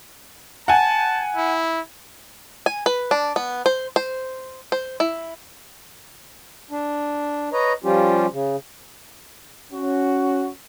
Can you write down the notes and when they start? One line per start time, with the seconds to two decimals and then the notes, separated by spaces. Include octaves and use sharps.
0.68 F#5 G#5 A5
1.36 E4
2.66 G#5
2.86 B4
3.11 D4
3.36 B3
3.66 C5
3.96 C5
4.72 C5
5.00 E4
6.71 D4
7.53 B4 C#5 D#5 A#5
7.84 F3 G3 C#4 F4 G4
8.32 C#3
9.73 C#4 F#4